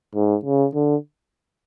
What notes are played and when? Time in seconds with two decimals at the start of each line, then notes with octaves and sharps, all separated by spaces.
0.15 G#2
0.45 C#3
0.75 D3